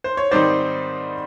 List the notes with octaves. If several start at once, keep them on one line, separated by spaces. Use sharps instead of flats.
C5
C#5
G#2 D#3 G3 C4 D#4 C5 D5